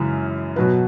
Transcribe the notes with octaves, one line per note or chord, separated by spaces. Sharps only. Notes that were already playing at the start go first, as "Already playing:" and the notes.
Already playing: F#2 C#3 E3 G#3
B2 F#3 B3